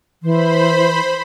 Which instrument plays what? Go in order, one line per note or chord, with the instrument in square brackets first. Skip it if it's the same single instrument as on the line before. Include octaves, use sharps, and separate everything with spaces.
[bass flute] E3 [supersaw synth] C5 B5